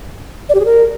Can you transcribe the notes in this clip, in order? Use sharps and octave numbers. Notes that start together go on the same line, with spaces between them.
D5
G4
G#4
A#4